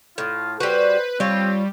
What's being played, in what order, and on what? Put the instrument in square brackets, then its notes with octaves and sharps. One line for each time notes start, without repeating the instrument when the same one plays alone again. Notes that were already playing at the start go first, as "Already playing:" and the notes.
[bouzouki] A2 [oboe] F4
[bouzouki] G3 F#4 [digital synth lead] B4 [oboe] C5
[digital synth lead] G3 [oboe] C4 [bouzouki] F4 C#5